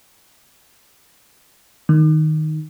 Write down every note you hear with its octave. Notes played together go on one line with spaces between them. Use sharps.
D#3